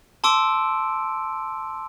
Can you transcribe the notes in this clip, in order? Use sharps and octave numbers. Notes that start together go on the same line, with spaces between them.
A5 C6 D6 E6 D7